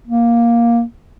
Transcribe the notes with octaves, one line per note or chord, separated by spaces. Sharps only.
A#3